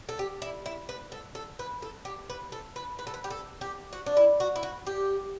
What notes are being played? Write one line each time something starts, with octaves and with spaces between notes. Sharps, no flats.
A4
G4
E4
E4
B4
A4
A4
B4
A4
G4
B4
A4
B4
B4
A4
B4
G4
A4
G4
F#4
D4
E4
F#4
E4
F#4
G4